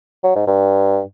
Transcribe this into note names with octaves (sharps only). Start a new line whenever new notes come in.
F#3
G#2
G2